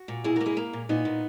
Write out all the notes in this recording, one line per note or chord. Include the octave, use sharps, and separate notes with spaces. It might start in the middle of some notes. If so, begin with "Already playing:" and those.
Already playing: F#4
A#2
B2 E4 G#4
A#3 F#4 A#4
E4 G#4
A#3
A#2
A#2 B3 D#4
A#2